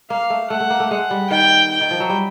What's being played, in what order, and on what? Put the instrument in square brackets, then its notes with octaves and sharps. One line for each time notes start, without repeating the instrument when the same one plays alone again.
[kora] A#3 [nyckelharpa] F5
[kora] A3
[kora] A3 [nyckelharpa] F#5
[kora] A3
A#3
A3
[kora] G#3 [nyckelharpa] F#5
[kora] G3
[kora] D#3 [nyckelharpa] G5
[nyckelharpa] G5
[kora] D#3
F3
F#3
G3